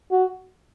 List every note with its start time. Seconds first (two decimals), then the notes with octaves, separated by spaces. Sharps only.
0.11 F#4